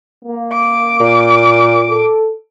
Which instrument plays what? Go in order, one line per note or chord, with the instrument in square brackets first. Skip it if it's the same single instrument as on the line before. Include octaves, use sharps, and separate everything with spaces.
[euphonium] A#3
[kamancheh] D6
[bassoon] A#2
[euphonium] A4